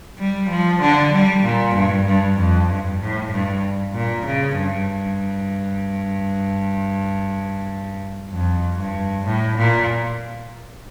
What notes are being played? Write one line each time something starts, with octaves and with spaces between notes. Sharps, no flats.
G3
F3
D3
G3
A#2
G2
G2
F2
G2
A2
G2
A#2
C#3
G2
F2
G2
A2
A#2